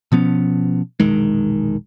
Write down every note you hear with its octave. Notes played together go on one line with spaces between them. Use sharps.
B2 F3 B3 C#4
E1 A#1 D#3 G#3